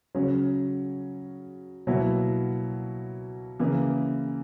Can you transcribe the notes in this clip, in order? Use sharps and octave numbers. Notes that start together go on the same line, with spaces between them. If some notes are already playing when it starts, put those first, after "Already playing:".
C#3 F#3 C#4
B2 F#3 A#3 E4
C#3 E3 A#3 E4